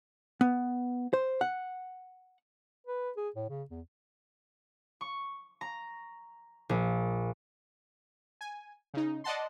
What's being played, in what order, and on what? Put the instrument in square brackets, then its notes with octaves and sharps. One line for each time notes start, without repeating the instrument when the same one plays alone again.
[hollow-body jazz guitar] B3
C5
F#5
[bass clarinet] B4
G#4
A2
C#3
E2
[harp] C#6
A#5
A#1
[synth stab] G#5
C#3 D#4
D5 D#5 F#5 A5 C6